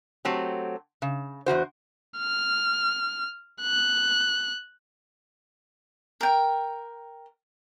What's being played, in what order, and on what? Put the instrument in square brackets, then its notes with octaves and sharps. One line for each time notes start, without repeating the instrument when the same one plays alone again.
[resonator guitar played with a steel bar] F#3 A3 C4 G4
C#3
E2 D#3 F#4 C5
[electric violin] F6
F#6
[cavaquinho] A#4 G5